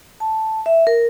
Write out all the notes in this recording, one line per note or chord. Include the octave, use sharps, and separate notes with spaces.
A5
E5
A#4